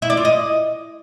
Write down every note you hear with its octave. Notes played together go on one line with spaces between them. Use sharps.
E4
D5
F4
D#5